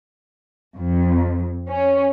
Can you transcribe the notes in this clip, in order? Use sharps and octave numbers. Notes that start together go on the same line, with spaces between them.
F2
C#4